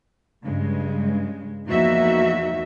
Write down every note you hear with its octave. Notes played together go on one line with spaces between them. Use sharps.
G2 C#3 G#3
E2 F3 A#3 D#4 F#4 E5